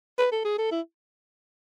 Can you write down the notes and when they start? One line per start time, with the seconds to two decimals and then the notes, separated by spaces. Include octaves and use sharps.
0.18 B4
0.32 A4
0.45 G#4
0.58 A4
0.71 E4